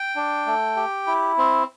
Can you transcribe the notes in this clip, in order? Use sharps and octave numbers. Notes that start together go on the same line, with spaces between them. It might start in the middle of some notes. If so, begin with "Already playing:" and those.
Already playing: G5
D4
A3
G4
E4
C4